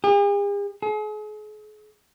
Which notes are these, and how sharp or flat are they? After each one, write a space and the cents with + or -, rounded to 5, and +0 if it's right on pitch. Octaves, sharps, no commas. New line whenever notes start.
G#4 -45
G#4 +40